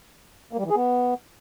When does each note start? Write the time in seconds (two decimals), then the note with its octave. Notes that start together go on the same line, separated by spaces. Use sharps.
0.53 A#3
0.59 G3
0.64 E3
0.70 G#4
0.76 B3